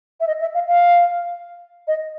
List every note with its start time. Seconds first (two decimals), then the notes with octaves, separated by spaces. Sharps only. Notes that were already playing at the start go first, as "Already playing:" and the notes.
0.21 E5
0.27 D#5
0.41 E5
0.54 F5
0.68 F5
1.88 D#5